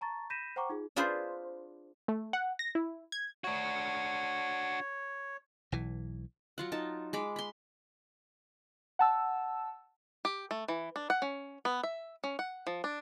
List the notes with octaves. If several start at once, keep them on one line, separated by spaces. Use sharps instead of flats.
A5 A#5 C#6 A6
B5 G6 A#6 B6 D#7 E7
C5 F#5 G5 A#5 C#6 D6
D#4 F4 G#4
D4 F4 G#4 B4 C5
A3
F#5
A#6
E4
G#6
D4 F#4 C#5
B1 E3
F#3 F4 F#5
D#4 A5
G#3 B5 D6
B5 C6
F#5 A5 E6
G4
A3
E3
D4
F#5
C#4
B3
E5
C#4
F#5
F3
D4